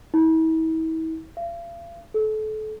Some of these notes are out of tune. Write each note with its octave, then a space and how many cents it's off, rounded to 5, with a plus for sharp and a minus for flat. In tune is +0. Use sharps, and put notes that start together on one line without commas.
E4 -40
F5 -40
A4 -30